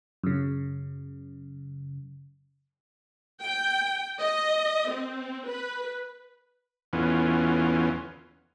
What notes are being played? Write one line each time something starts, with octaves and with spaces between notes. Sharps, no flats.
F#2 C#3
G5
D#5
C4
B4
E2 E3 B3 C#4 F4